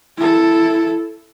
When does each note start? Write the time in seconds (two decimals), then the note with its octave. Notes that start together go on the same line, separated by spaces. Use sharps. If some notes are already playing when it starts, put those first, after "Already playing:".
0.17 E4 A4